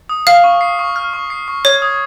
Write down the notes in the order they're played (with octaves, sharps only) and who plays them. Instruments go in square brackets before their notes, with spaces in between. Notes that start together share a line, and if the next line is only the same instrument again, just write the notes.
[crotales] D#6
[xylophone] F5 [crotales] F6
[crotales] C#6
C7
C#6
F6
C#6
C7
C#6
[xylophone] C#5 [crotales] G#6
[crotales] D#6